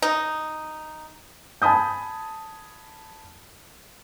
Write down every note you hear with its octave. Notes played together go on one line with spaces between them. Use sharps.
D#4
G#5 A5 B5 D#6 G6